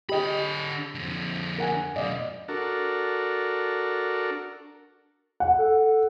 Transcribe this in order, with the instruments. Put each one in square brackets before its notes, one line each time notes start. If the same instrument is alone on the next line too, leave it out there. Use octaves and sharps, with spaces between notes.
[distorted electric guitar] D3 B5 [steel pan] G4 D#5 G5
[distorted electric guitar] F2 D3
[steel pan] A#4 F#5 G#5
[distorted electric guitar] F#2 B2 [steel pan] D5 D#5 F5
[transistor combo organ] D4 F#4 A4 A#4
[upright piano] F#5
[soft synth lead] A4